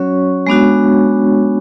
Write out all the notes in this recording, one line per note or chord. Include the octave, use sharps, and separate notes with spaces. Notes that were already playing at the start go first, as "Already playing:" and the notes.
Already playing: F#3 C#4 F#4 C#5 C#6
G#3 B3 D4 F#4